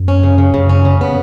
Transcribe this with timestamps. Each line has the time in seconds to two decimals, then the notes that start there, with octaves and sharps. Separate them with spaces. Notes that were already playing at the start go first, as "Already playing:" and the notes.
Already playing: F#2
0.08 C#4
0.23 C#3
0.38 C#3
0.54 F#2 C#3
0.69 C#4
0.85 C#3
1.01 B3